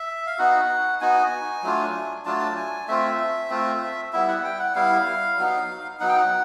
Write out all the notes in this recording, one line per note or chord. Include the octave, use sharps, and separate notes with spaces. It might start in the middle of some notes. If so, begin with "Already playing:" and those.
Already playing: E5
F5
B3 D#4 F#4 F#5
B3 D#4 F#4 G#5
F#3 A3 D4 F4
F#3 A3 D4 F4 A5
G#5
A3 C4 F4 E5
A3 C4 F4
G3 B3 E4 E5
F#5
G5
F#5
G3 B3 E4 F5
F#3 B3 D#4
F#3 B3 D#4 F#5
G5
F#5